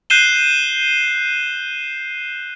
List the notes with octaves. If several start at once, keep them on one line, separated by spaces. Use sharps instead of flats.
F#6 G6 C7 D#7 E7 G7